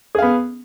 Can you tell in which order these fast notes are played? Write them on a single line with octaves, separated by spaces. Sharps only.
G#4 F5 B3